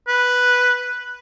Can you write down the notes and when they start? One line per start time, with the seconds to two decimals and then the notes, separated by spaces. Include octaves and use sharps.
0.08 B4